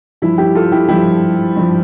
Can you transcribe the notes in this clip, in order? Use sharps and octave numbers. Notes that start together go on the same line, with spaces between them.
G2 F3 E4
E4 G4
F4 A4
E4 G4
G2 F3 E4 G4
G2 F3